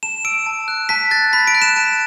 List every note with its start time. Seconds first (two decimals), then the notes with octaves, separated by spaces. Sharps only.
0.03 A5 E7
0.25 E6 D7
0.46 A5
0.68 F#6
0.89 A5 B6
1.11 F#6 A6
1.33 B5 B6
1.47 D7
1.55 F#6
1.62 E7
1.76 A5 E7